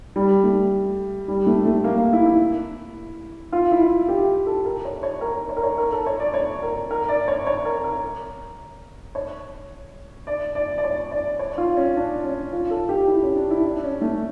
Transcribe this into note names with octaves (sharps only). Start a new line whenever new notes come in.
G3
A3
G3
A3
A3
A#3
A#3
E4
E4
F4
E4
F4
G4
A4
A#4
C#5
C#5
A#4
C#5
A#4
C#5
A#4
A4
C#5
D5
C#5
A#4
A#4
D5
C#5
C#5
A#4
A#4
C#5
D5
D5
D5
C#5
D5
C#5
F4
C#4
D4
C#4
F4
A4
G4
E4
C#4
D4
E4
D4
C#4
A3